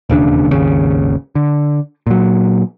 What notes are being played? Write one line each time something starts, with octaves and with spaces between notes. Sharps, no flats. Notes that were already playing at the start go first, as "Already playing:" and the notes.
E1 D#2 C#3 D4
G#1 D#2 C#3
D3
A#2 F#3